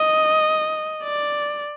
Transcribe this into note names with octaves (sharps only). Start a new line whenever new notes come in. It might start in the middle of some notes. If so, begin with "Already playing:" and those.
Already playing: D#5
D5